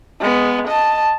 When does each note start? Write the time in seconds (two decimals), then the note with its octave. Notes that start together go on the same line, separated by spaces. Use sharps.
0.20 G#3 B3
0.68 D#5 A5